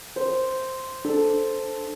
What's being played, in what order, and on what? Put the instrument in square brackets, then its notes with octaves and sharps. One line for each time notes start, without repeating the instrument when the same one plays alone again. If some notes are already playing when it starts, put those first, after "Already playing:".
[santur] C5
[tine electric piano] D4 [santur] A4